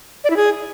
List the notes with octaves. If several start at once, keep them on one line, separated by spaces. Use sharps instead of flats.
D5
E4
G#4